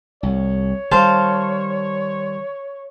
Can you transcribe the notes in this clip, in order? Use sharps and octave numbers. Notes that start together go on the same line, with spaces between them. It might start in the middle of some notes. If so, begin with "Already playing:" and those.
C2 C#5
D#3 G3 C5 F5 A5